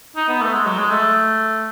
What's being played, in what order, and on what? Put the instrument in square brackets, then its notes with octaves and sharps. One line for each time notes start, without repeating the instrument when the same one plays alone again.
[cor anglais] D#4
B3
A3
G#3
F#3
G#3
A3